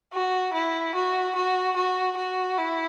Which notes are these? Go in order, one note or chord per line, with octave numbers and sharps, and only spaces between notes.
F#4
E4
F#4
F#4
F#4
F#4
E4